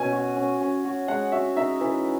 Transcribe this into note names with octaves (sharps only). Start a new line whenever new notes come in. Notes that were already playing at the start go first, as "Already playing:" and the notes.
Already playing: B2 C#4 G#5
F#4
C#4
C#4
F#4
G#3 F#5
F#4 E5
D#4 E5
E3